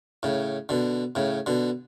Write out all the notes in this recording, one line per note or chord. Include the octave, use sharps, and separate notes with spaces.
A2 C#3
B2 D3
A2 C#3
B2 D3